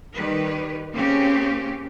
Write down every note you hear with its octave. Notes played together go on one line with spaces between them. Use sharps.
D#3 G3 G4 B4
C#3 A#3 C4 C#4 G4